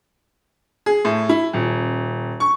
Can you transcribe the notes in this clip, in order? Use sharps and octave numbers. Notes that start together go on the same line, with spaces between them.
G#4
A2
E4
D#1
C#6